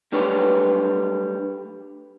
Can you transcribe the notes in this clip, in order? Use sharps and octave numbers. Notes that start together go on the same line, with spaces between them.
F#3 G3 A3 D4 B4 C#5